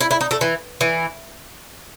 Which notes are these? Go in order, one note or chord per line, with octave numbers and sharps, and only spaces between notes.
E4
E4
D#4
A3
E3
E3